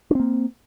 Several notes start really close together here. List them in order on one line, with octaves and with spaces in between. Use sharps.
D4 C4 A#3